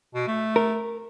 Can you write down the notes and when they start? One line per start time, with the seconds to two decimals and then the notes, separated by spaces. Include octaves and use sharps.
0.15 B2
0.27 A3
0.56 A#4